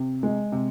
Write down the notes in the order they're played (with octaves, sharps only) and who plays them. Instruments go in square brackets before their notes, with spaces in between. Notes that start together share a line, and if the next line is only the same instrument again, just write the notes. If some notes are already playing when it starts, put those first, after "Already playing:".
Already playing: [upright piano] C3
G#3
C3